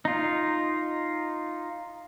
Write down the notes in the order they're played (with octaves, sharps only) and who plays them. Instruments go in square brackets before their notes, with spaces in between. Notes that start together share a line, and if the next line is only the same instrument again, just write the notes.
[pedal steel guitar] D#4 F4